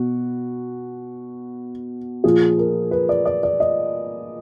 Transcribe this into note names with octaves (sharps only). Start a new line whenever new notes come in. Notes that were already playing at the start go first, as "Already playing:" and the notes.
Already playing: B2 F#4
A#2 F3 G#4
A#4
B4
D5
D5
D5
D#5